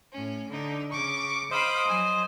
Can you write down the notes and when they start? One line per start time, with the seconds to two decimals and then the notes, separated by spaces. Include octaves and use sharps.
0.12 A2 C#4
0.48 D3 D#4
0.92 C#3 C#6 D6
1.51 C5 D#5 F5 B5 D6
1.88 F#3 G#5